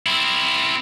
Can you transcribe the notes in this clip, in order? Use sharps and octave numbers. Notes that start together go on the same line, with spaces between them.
C4 E4